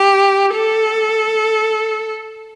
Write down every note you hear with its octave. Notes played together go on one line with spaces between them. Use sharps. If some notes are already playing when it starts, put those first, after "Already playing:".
Already playing: G4
A4